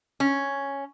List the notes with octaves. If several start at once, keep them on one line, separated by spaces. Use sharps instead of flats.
C#4